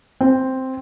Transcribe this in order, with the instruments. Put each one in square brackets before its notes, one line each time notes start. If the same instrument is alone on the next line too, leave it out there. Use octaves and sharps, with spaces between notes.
[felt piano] C4